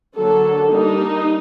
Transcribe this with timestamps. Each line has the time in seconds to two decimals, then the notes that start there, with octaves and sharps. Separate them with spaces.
0.15 D3 F#3 A#3 A4
0.70 G3 A#3 D4 D#4